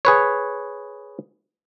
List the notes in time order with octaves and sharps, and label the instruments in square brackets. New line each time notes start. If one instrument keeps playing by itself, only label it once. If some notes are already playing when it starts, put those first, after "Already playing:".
[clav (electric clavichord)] G#4 B4 C#5